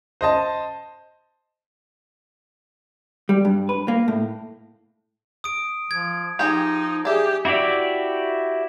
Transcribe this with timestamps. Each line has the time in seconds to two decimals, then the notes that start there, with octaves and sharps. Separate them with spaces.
0.21 C5 D#5 A5
3.29 G3
3.45 G2
3.69 B4
3.88 A#3
4.08 A2
5.44 D#6 D7
5.91 F3 G#6
6.39 F3 D#4 G4 G#4
7.05 G4 G#4 D5 E5
7.45 E4 F#4 G4 D5 E5